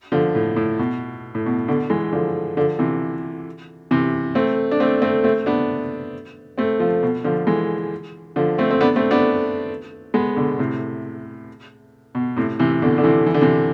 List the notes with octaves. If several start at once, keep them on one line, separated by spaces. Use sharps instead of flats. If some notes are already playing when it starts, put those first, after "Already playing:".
D3 F3
A2
A2
B2
A2
B2
B2 D3
E3 G#3
D3 F3
D3 F3
C3 E3
C3 E3
A3 C4
D4
A3 C4
A3 C4
A3 C4
B3 D4
A3 C4
F3 A3
B2
D3 F3
E3 G#3
D3 F3
A3 C4
C4
B3 D4
A3 C4
B3 D4
G#3 B3
B2 D3
A2 C3
B2
A2 C3
C3 E3
B2 D3
D3
C3 E3
E3
D3
C3 E3